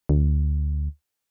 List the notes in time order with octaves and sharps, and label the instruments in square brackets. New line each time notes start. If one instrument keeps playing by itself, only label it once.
[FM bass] D2